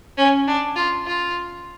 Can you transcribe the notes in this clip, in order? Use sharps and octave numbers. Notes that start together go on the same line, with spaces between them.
C#4
D4
F4
F4